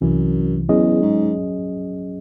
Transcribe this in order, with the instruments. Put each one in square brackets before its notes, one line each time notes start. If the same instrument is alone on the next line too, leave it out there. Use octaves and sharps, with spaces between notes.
[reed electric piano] C2 C3 E3 [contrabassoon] F#2
[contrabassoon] E2 [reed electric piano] F#3 C#4 G#4 D#5
[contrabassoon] G#2